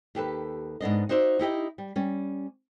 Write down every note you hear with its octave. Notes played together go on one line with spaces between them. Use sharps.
D#2 G4 A4 B4
G#2 B3 D4 D#5
D#4 F#4 C5 D5 E5
D#4 E4 G4 D#5
G3
G3 C#4